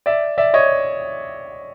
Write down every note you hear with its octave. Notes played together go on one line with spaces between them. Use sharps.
D5 E5
D5 E5
C#5 D#5